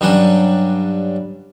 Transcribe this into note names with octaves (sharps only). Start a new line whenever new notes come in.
G2 F#3 G3 C#4 D4